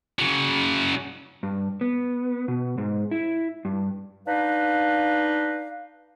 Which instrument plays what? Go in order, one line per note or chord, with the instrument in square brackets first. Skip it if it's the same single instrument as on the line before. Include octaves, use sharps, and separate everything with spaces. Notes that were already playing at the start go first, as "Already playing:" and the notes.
[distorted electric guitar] C#3 F#3
[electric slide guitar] G2
B3
B2
G#2
E4
G2
[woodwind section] D4 D#4 B4 F5